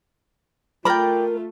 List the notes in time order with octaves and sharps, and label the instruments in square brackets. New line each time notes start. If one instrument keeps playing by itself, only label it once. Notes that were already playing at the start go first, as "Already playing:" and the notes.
[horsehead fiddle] A3 F4 [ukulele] A#4 B5 [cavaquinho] D5 G5